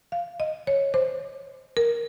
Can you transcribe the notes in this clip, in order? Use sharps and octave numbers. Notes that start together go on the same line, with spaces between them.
F5
D#5
C#5
C5
A#4